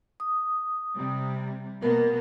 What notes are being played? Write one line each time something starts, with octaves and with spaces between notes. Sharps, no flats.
D#6
C3 G3
B2 A#3 B3 A#4